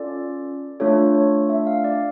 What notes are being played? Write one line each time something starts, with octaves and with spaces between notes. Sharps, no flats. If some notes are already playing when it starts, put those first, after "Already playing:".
Already playing: C#4 F4 A4 D5
A3 D4 F4 A4 C#5
C#5
E5
F5
D5